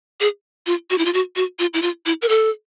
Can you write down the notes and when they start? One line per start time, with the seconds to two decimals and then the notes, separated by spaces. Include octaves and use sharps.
0.21 G#4
0.67 F4
0.90 F#4
0.98 E4
1.05 F4
1.13 F#4
1.36 F#4
1.59 F4
1.74 E4
1.82 F4
2.06 E4
2.22 A#4
2.29 A4